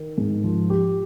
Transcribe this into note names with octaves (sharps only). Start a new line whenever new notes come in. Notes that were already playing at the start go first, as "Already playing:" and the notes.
Already playing: D#3
G#2
F3
G4